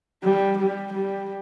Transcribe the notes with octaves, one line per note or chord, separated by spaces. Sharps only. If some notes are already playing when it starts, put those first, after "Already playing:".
G3
G3
G3